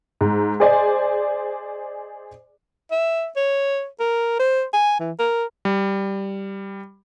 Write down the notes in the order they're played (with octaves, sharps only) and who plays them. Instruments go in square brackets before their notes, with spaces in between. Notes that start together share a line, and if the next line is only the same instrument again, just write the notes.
[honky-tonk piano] G#2
G#4 C5 D5 D#5 G#5
[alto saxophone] E5
C#5
A#4
C5
G#5
E3
A#4
[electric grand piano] G3